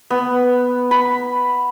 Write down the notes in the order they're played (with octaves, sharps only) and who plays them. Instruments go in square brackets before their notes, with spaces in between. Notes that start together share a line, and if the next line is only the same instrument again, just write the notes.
[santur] B3
B5